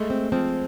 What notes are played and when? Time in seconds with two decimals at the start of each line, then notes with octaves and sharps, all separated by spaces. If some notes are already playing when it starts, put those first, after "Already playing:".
Already playing: G#3 A3
0.10 C4
0.32 F3 C4